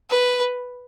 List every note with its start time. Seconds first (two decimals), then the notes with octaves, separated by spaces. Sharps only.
0.10 B4